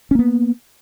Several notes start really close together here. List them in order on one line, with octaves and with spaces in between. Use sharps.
C#4 A#3 B3